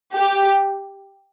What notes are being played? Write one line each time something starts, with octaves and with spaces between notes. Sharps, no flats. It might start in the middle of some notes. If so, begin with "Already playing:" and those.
G4